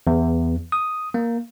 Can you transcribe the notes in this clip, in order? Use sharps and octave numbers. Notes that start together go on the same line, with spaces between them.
E2
D#6
A#3